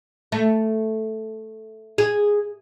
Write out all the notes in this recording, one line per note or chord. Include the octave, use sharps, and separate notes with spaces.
A3
G#4